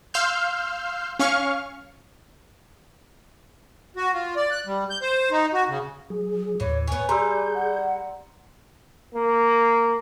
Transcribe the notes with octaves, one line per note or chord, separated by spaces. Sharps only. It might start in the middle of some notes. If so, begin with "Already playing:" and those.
F5 C6 E6 F6 G6
C#4 F5 C#6 F6
F#4
F4
D5
F#6
G3
G6
C5
D#4
F#4
C#3
F#3 G#4
D#2 A2 E3 C#5
B3 C#5 G#5
G3 G#4 A#5 C6 E6 G6
F#5
A#3